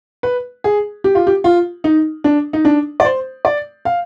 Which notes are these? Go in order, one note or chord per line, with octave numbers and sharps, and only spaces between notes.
B4
G#4
G4
F4
G4
F4
D#4
D4
D#4
D4
D5
C5
D5
F5